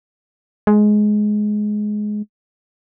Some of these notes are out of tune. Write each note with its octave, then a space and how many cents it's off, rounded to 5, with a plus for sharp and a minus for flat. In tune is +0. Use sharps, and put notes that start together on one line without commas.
G#3 +15